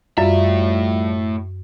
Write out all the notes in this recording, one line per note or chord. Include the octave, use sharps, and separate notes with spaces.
F#2 A2 G3 F4 E5